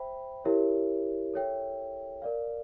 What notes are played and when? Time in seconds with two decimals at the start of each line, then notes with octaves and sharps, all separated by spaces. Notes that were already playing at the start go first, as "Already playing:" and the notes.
Already playing: C5 E5 G5 B5
0.44 E4 G4 A#4 C#5 E5
1.34 A4 C#5 E5 G5
2.22 A#4 D5 F5